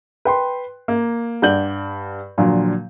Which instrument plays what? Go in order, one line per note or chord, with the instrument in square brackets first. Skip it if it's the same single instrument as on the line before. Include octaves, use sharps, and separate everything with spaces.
[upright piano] B4 G5 C6
A#3
G2 D5 F#5 G6 F#7
A#2 D3 F3 F#3